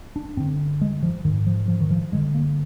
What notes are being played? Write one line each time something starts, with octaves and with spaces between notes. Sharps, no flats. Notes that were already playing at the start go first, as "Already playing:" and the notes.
D4
G2 D3 C4
G#3
F3
G#2 D#3
F3
F3
D#3
F3
G2 D3 G#3
A#3